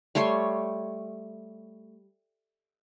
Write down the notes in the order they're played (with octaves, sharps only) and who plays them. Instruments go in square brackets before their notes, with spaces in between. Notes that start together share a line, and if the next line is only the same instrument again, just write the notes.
[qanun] G3 A3 C#5 C6